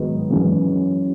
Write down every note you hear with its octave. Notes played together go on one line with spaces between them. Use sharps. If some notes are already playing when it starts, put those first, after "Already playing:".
Already playing: G#2 D#3 F#3 B3 D#4
F#2 E3 G#3 C#4